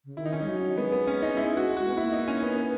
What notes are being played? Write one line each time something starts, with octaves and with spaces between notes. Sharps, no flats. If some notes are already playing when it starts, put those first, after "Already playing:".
C#3
D#3 E4
D#4
C#4
G#3 D#4
F#3
G#3 B3
B3
C#4
D#4
E4
F#4
F#4
B3
A#3 E4
D#4
C#4
B3
B3